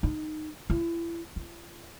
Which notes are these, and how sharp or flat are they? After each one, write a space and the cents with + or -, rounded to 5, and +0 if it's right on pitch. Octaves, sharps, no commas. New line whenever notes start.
D#4 -15
E4 +30
F4 -40